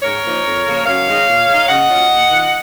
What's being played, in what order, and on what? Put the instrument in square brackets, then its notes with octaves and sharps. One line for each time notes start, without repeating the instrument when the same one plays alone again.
[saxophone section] G#2 A#4 C#5
F3 A#3 D#4
F2
C#3 F3 A#3
F#2 C#5 F5
D#3 G#3 D#4
A#2
G#3 D#4
C#3 D#5 F#5
F#3 C#4 F4
D#2
D#3 A#3 F4